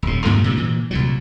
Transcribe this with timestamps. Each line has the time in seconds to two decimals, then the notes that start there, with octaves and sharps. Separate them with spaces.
0.03 D#1 A2
0.24 G2 A#2 D#3 A3
0.44 A#2 C#3 F3 G3
0.57 A#2 E3
0.91 C2 A#2 F#3